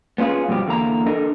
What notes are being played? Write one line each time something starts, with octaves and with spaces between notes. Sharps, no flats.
B3 C#4 F4 G#4
G2 B2 F3 G4
E2 D3 A#3 A#5
D4 A4 A#4 D#5